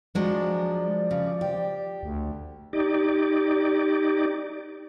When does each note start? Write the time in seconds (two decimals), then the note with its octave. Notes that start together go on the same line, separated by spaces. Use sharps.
0.15 F3 F#3 G#3 D4 D5
1.11 C#3
1.41 G4
2.03 D2
2.73 D#4 G4 D5